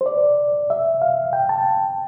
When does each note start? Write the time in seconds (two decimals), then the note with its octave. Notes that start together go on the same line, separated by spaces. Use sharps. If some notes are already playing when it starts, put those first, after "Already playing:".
0.01 C5
0.06 D5
0.70 E5
1.02 F5
1.33 G5
1.49 A5